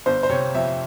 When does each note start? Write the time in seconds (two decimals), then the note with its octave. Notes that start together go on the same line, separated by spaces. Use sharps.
0.06 G1 C5
0.23 C5
0.29 C3 C#5
0.55 F2 E5